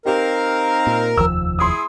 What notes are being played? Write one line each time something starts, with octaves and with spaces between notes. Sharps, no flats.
C4 D#4 G4 A#4 F5
A#2
F1 D#2 F3 E6
E4 G#4 C6 D#6